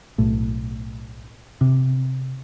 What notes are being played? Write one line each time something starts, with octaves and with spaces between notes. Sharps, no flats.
B1 A2
C3